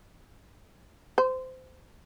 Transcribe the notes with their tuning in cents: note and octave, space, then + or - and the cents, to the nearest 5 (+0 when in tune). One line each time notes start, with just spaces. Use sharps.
C5 -20